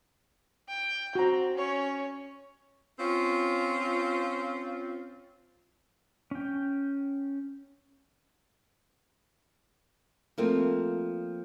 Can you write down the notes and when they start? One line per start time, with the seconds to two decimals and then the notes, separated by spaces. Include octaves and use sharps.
0.69 G5
1.15 C4 F#4 A#5
1.57 C#4 C#5
2.98 C4 C#4 F4
6.31 C#4 G5
10.38 F3 A3 A#3 C4 F4